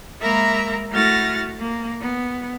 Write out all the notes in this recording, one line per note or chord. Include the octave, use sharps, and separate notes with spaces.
G#3 A#3 A#4 E5 A#5 B5
A3 E4 F#4 F6 A6 A#6
A#3
B3